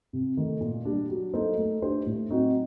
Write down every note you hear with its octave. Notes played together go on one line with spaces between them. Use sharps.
C3
D#3 A3
A#2
G3 D4
F#3
A#3 D#4 A4 C5
A3
D4 G4 C5
A2
F#3 C4 D#4 F#4